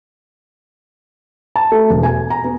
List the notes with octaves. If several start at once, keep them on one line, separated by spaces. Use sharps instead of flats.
A5
A3
E1
G#5
A#5
B3